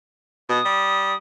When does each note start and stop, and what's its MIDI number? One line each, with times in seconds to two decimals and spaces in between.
0.49 0.60 47
0.49 1.16 87
0.65 1.13 55